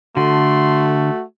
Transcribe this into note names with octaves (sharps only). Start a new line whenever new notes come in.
D3 A3 F#4 C6